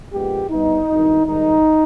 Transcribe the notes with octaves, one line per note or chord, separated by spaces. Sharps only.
A#1 A#2 G#3 B3 G4
G2 G3 B3 D#4
G#1 G2 D#3
G#2 D#3 G3 D#4